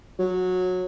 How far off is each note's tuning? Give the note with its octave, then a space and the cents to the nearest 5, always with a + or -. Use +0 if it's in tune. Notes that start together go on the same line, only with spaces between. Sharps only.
F#3 -15